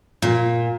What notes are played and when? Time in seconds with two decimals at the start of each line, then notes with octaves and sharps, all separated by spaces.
0.22 A#2